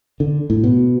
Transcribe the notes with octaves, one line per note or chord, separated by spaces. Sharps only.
D3
A2
B2